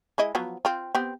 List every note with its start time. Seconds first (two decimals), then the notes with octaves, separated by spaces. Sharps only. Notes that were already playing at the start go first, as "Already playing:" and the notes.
0.18 G#3 E4 D#5
0.35 F3 F#3 B3
0.65 C4 F4
0.95 B3 C4 G4